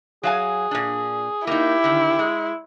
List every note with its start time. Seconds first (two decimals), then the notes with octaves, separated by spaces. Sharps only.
0.23 F#3 G#4 F5 G#5
0.71 A#2 D4
1.47 A#3 D#4 E4 G4
1.84 D3 D#3
2.19 G#3